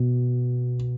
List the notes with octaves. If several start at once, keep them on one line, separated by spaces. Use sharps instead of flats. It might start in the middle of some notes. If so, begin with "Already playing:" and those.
Already playing: B2